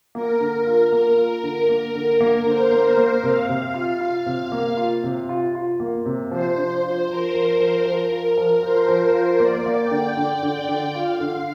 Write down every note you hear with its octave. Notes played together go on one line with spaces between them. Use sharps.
A#3 A#4
D3
F4
A#3
F4
D3
A#3
D3
A#3
D3 C5
A#3
A#3
C3 F5
C3
F4
F4
C3
A#3
F4
C3
F4
F4
A#3
C3
F3 C5
D4
F4
F3 A#4
F3
A#4
F3
F3
F4
F3
F3 C5
F3
F4
A#3 D5
A#3
G5
D3
D3
D3
D3
F4 F5
D3